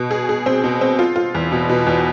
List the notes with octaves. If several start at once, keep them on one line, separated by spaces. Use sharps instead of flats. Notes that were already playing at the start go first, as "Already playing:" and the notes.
Already playing: B2
G#4
G#4
C4
B2
C4
F4
F4
E2
B2
B2
E2